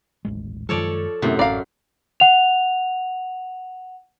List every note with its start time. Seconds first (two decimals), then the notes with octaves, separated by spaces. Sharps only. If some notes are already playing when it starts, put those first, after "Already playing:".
0.25 D#1 A1 G#3
0.69 F#2 D#3 F3 G#3 A4 C#5 D5
1.22 F#2 A2 C3 B3 C4
1.39 A1 D5 F5 A#5
2.20 F#5 F7